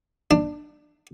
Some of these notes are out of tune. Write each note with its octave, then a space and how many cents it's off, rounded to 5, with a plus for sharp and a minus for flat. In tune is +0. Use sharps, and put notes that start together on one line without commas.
D4 +20